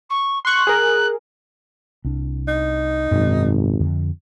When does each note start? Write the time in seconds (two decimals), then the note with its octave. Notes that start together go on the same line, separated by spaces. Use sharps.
0.10 C#6
0.45 C6 C#6 F#6
0.67 G#4 A#4
2.04 C2 D4
2.48 D#4
3.11 G#1 F#2 B2
3.80 F2 D3